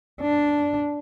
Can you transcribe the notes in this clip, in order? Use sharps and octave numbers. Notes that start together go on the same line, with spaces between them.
D4